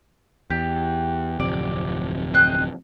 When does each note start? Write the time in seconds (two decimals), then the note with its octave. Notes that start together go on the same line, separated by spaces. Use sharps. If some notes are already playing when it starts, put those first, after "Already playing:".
0.50 E2 G4
1.40 D1 F2 C3 D5
2.34 C4 D#5 F#6